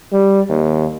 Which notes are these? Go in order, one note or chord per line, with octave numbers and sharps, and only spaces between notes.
G3
D#2